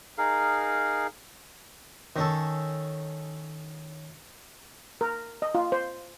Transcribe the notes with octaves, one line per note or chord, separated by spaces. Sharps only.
D#4 G#4 A#4 F5
D#3 C#4 A4
A#4
D#5
F4
C5